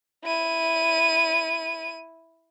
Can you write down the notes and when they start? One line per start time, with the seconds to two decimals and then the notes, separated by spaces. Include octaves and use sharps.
0.24 E4 D#7